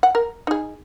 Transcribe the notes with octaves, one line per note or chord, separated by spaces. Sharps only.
F#5
A#4
D#4 G#4